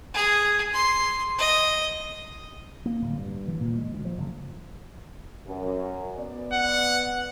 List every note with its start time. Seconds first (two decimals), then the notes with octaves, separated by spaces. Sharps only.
0.14 G#4
0.73 C6
1.39 D#5
2.86 A#3
3.02 D1
3.14 G2
3.48 E3
3.61 A#2
3.78 G#3
3.92 D2
4.05 F3
4.18 F#1
5.48 F#2
6.18 B3 D5
6.53 F#5